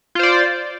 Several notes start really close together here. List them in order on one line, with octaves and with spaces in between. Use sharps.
F4 C5 D5